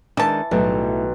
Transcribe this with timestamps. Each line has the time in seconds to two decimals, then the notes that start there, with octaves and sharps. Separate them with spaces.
0.17 D#3 E3 G#3 D4 A5
0.51 B1 A2 G3 A3